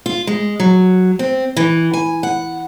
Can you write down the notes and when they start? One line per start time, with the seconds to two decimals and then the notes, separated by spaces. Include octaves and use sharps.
0.06 F4
0.27 G#3
0.60 F#3
1.19 C4
1.57 E3
1.94 G#5
2.23 F#5